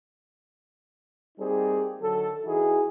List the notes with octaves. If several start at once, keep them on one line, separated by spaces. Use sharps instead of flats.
G3 A#3 C4 D#4 G4 G#4
D3 D#3 F#3 A4
E3 D#4 E4 F#4 G#4